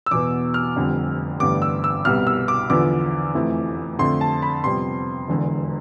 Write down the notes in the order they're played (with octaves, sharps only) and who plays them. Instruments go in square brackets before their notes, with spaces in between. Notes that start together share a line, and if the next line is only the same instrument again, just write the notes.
[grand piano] E6
E2 B2 B3 D6
F6
F1 F2 D3 G3
A1 G2 D3 G3 B3 D6
E6
E6
C2 B2 G3 B3 F6
E6
D6
E2 D3 F3 B3 D6
F1 F2 E3 A3
F2 D3 A3 C6
A5
B5
F2 C3 G3 B3 C6
E1 E2 D3